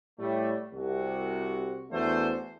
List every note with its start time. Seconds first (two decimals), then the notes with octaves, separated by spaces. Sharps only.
0.19 A2 G3 A3
0.73 C2 C3 F#4
1.91 E2 E3 A3 D4 F#4 C5